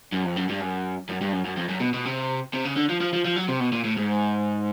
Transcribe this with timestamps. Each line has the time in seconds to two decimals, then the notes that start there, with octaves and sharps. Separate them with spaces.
0.13 F#2
0.25 F2
0.37 F#2
0.50 G2
0.61 F#2
1.09 F#2
1.21 G2
1.33 F#2
1.45 F#2
1.57 F2
1.69 F#2
1.80 B2
1.94 B2
2.05 C3
2.53 C3
2.65 C#3
2.76 D3
2.89 F3
3.01 F3
3.13 F3
3.25 F3
3.36 F#3
3.48 C3
3.60 B2
3.72 A#2
3.84 A2
3.97 G#2